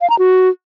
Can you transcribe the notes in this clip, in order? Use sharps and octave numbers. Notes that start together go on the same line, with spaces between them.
F5
A#5
F#4